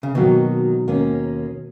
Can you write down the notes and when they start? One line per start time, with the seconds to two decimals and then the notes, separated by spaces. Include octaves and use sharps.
0.03 C#3
0.15 B2 D#3 F#3 A#3 D#4
0.88 D#2 D#3 A#3 C#4